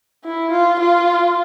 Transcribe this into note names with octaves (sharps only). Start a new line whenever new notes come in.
E4
F4
F4